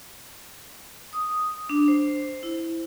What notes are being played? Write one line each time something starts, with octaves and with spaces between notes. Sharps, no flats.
D#6
D4
C5
E4